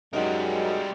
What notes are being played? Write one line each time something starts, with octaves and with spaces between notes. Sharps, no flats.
F#2 G3 G#3 D#4 F#4 A#4